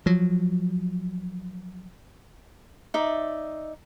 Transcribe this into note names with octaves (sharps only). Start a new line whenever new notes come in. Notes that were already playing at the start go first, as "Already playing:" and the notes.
F3 F#3
D#4 D5 E5